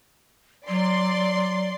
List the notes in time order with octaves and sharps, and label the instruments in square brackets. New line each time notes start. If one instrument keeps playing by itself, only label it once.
[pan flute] F#3 [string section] D5 C6